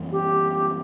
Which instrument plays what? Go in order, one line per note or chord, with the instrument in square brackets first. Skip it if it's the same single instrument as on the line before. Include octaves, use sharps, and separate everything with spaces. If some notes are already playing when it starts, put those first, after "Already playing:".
Already playing: [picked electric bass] F#2 E3 G3 C#4
[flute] G4